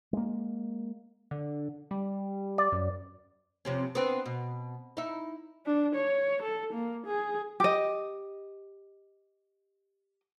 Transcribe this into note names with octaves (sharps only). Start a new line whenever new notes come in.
G#3 A#3
D3
G3
D5
F#2
F2 C3 C#4
B3 C4 D4
B2
D#4 E4
D4
C#5
A4
A#3
G#4
G4 D#5